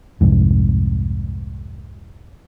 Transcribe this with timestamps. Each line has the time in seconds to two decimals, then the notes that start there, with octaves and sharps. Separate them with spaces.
0.21 C2 F2 G#2